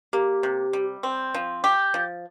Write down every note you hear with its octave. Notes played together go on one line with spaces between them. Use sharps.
A#3 G4
C3
G3
C4
F3
G4
F3